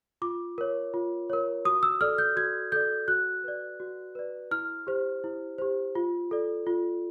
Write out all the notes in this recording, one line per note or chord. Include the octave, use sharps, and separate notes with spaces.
F4 D6
A#4 C#5
F4
A#4 C#5
F#4 D#6
E6
A4 D5 F6
G6
F#4 G#6
A4 D5 G6
F#4 F#6
B4 D5
F#4
B4 D5
E4 F6
G4 C5
E4
G4 C5
F4
A4 D5
F4